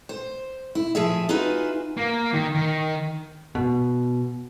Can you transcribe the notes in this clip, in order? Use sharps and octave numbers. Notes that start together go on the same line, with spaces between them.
C5
E4
D2 F3 G#4 E5
D#4 F4 F#4 G#4 B4 E5
A#3
D#3
D#3
B2